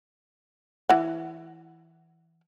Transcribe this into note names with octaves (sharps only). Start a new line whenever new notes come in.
E3 F#5